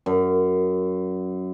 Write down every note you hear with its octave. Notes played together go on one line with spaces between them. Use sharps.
F#2